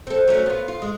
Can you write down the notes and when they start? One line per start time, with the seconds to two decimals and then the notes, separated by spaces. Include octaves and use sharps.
0.07 C4 A4
0.28 F#3 A3 C#4
0.46 B3 F4
0.68 F4
0.82 G#3